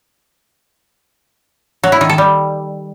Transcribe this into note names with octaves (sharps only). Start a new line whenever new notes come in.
F#3
E4
D#3
A4
G3